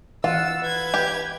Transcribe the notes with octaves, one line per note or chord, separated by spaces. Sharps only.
E3 F4 F#5 E6
B4 G#6
G4